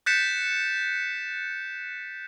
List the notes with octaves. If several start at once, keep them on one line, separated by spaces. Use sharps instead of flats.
F#6 G6 A6 B6 C#7 E7